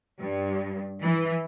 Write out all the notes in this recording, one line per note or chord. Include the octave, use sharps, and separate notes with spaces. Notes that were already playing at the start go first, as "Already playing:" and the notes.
G2
E3